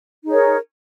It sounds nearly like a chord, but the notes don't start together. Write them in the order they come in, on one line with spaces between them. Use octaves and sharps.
D#4 G#4 C#5 A#4